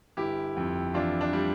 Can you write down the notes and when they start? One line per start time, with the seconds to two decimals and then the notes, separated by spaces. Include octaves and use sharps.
0.17 G1 E4 G4
0.57 F2
0.94 E3 D4 F4
1.21 D4
1.33 G3